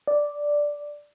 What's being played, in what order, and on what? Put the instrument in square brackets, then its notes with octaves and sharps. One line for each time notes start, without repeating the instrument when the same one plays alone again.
[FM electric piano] D5